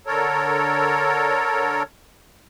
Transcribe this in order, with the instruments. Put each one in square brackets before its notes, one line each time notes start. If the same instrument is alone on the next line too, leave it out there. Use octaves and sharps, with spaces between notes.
[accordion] D3 A4 A#4 C#5